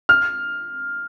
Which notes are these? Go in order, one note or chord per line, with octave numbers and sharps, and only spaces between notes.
F6